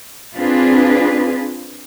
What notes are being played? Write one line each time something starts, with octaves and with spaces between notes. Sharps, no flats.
C4 D4 F4 G#4 B4